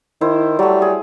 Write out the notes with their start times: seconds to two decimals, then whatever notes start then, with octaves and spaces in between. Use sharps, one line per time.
0.21 D#3 E4 C5
0.59 F#3 G3 A3
0.82 G#4